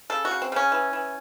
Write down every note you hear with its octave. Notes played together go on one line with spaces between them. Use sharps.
C#3 A4
F#4
C#3
C4
C#3 C#4
E3
E3